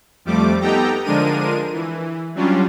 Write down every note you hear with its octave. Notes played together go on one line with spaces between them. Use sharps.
F2 F3 G3 A3 D6
B3 D#4 G4 A4 G5 A#5
D3 F3 G#3 D4 A#4 D#7
E3
F#3 G3 C#4 D4 F4